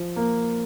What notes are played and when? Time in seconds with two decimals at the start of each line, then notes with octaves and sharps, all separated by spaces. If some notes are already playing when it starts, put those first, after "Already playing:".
Already playing: F3
0.16 A#3